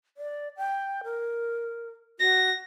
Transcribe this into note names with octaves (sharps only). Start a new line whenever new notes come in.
D5
G5
A#4
F#4 A#6